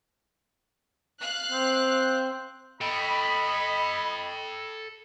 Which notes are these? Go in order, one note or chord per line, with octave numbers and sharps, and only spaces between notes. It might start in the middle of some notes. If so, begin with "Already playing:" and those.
F5 F#6
C4
A4 D#5 G5 B5